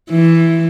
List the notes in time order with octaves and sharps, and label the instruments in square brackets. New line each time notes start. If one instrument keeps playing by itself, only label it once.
[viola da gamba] E3